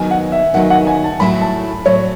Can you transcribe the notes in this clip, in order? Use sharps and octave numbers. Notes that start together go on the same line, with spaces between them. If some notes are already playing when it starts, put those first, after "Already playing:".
Already playing: D#3 F#3 B3 D#4 G#5
F#5
E5
D#3 F#3 B3 D#4 F#5
F#5
G#5
A5
A2 F#3 A3 E4 B5
A5
A2 F#3 A3 E4 C#5